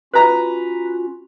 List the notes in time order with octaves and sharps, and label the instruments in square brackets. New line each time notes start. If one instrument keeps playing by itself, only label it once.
[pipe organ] C#4 F4 F#4 [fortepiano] B4 A#5